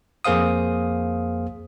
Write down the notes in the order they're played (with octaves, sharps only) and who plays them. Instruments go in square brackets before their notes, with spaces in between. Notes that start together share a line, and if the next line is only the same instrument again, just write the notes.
[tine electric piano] F2 A#3 G#4 C5 F5 D#6